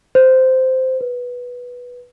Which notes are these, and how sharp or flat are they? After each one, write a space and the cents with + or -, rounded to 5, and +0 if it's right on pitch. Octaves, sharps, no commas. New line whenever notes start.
C5 -10
B4 -10